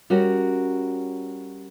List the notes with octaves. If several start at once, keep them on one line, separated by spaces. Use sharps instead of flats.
G3 C#4 F#4 A#4 C#5